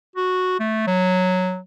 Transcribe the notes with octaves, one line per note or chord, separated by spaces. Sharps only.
F#4
A3
F#3